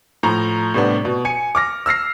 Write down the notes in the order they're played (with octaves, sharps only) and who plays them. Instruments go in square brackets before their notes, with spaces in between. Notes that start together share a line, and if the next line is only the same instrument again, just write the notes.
[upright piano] A2 F3 A#5
A2 C3 G3 B3 D4
B2
G#5 C#7
D6 F6 A#6
E6 F6 A#6 C7